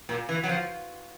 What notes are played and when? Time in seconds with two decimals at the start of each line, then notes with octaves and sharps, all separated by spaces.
0.09 A#2
0.29 E3
0.43 F#3
0.49 F3